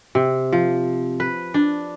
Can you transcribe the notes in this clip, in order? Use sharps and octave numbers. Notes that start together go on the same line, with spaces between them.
C3
F3
B4
D4